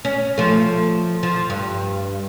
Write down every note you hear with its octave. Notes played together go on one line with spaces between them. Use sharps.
C#4
F3 A3
F3
G2